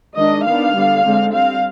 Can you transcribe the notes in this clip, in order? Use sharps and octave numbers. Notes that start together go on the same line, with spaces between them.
D#3 G#3 D4 D#5
D#3 B3 D4 F5
D3 G3 B3
D3 G#3 C4
G3 C4 F5